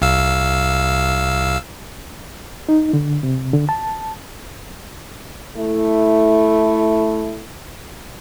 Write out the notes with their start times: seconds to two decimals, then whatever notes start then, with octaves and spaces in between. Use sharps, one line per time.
0.02 C2 F5 E6
2.69 D#4
2.93 D3
3.23 C3
3.53 D3
3.69 A5
5.56 A3 E4